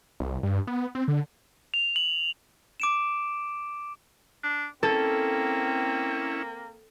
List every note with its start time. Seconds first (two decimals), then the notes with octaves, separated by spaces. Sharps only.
0.20 C2
0.43 G2
0.67 B3
0.95 C4
1.08 D3
1.74 F7
1.96 F#7
2.80 D6 D7 E7
4.43 D4
4.83 A#3 C4 C#4 E4 A4